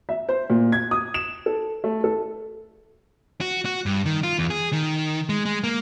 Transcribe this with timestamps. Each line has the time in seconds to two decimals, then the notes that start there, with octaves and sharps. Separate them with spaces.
0.09 E5
0.29 C5
0.50 A#2
0.72 G#6
0.91 D#6
1.14 E7
1.46 A4
1.84 A3
2.04 A4
3.41 F#4
3.65 F#4
3.86 G2
4.06 D#3
4.23 F4
4.39 E2
4.50 G#4
4.73 D#3
5.29 G#3
5.46 G#3
5.64 A#3